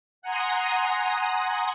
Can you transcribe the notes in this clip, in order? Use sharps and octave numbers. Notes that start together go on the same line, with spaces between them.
F#5 G#5 A#5 C6 D#6